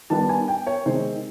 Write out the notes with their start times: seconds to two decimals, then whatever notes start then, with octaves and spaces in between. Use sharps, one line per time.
0.10 D#3 G3 B3 D4 A5
0.29 G#5
0.48 G5
0.67 C#5
0.86 C3 D#3 G#3 C4 D#4 C5